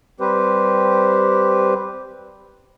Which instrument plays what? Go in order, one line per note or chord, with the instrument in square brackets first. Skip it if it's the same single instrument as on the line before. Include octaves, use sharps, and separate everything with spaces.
[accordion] G3 C4 G4 B4 C5